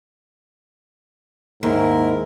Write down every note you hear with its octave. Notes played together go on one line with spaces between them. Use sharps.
D#2 G#2 E4 A#4